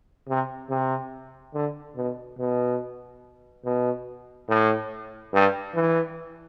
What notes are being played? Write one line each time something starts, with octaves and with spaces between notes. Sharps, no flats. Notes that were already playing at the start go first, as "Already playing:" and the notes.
C3
C3
D3
B2
B2
B2
A2
G2
E3